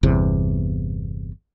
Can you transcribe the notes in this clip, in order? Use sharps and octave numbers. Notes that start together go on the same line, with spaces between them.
G1 E2 C3